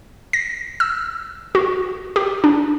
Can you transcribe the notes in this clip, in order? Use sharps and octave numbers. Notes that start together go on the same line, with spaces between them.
A#6
E6
F#4
G4
D4